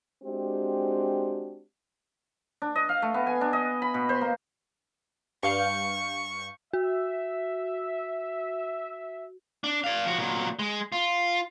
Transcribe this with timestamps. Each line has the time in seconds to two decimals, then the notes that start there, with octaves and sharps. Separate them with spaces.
0.24 G#3 C4 D4 F#4 G4
2.62 D4
2.75 D#5
2.89 F5
3.02 A3
3.14 B3
3.27 G#5
3.41 D4
3.53 D#5
3.82 B5
3.94 B2
4.09 C5
4.21 A#3
5.43 G2 F5 C#6 G6
6.73 F#4 E5
9.64 D4
9.84 D5 F5
10.05 F3 F#4
10.18 A#2 F#3
10.59 G#3
10.92 F4